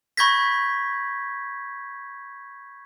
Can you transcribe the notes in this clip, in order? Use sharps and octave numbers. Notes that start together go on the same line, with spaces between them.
B5 C#6 G6 G#6 A#6 B6